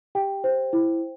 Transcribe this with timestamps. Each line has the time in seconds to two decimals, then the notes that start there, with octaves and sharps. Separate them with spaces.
0.15 G4 G5
0.44 C5
0.73 E4